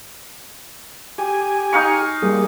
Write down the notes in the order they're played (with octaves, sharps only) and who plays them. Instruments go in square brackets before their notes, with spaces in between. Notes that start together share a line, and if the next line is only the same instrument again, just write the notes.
[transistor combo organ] G4 G#5
[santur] D#4 F5 C#6
[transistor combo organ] G3 A#3 G#4